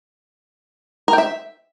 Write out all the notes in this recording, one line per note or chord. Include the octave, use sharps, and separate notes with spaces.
A#4
G5
E5